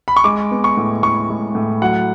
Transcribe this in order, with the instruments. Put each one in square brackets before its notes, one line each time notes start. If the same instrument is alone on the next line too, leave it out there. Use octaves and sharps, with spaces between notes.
[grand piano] B5
C#6
G#3 D6
B3
C#6
A2
A2 C#6
G#3
A2
F#3 F#5